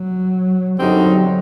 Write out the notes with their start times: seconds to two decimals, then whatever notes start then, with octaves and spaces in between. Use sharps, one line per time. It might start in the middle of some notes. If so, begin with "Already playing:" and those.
Already playing: F#3
0.79 F#2 D3 F#3 G3 C4 D#4